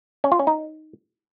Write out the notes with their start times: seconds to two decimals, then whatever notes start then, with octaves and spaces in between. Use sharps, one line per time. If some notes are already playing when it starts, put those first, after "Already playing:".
0.24 C#4
0.32 F4
0.39 C#4
0.47 D#4